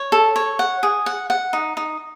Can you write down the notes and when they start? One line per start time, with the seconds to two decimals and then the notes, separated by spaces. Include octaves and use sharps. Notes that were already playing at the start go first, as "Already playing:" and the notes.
Already playing: C#5
0.12 A4
0.36 C#5
0.59 F#5
0.83 G#4
1.06 F#5
1.30 F#5
1.53 D#4
1.77 D#4